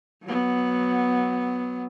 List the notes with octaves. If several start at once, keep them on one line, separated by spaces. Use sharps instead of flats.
F#3 B3